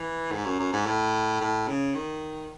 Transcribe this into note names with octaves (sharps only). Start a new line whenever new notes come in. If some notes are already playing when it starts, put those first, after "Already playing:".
Already playing: E3
G#2
F#2
F#2
G#2
A2
A2
C#3
D#3